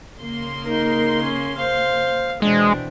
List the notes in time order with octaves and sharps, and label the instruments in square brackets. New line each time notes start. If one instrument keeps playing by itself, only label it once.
[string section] C#3 A#3 C6
[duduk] D#4 [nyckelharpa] A#4
[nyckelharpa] C#4
[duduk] C5 [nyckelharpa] F5
[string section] B2 E3 C4 [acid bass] G#3 [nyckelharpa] D4